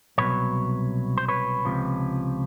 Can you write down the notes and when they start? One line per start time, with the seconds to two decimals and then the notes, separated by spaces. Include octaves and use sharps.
0.18 C2 B2 F#3 B4 C#5
1.18 C5
1.28 B4 C#5
1.65 C#2 C3 F3